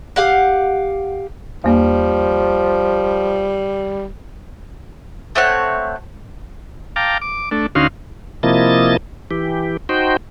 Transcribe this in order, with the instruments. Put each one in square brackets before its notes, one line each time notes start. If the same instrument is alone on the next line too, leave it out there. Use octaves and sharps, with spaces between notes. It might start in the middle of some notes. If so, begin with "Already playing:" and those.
[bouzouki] G4 F5 F#5
[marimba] E2 A#3 [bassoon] F3 [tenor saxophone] G3
[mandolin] A3 C4 C#5 F#5
[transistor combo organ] F5 G5 A5 A#5 D6
D6
A3 D4
D2 C#4 D#4 F#4 F5 C6
[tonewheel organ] C3 F3 A#3 E4 D#5 A6
E3 G4
D#4 F#4 C5 G5